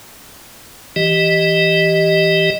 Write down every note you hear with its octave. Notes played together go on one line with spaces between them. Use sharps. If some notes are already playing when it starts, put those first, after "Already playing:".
E3 G4 D#5